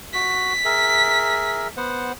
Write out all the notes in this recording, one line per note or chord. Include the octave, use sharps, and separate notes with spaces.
F#4 B6
G#4 A#4 E5
B3 C5 F#5